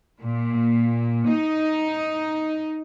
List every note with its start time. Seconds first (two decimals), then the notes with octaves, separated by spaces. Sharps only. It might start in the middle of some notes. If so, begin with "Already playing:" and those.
0.22 A#2
1.29 D#4